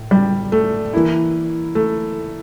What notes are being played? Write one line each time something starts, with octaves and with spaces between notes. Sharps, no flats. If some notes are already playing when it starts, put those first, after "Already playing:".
Already playing: A2
G3
A3
E3 A#3 E4
A3